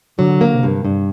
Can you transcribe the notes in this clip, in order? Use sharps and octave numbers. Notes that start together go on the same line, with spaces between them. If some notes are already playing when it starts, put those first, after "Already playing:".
D3 F#3
A#3
C3
G2
G2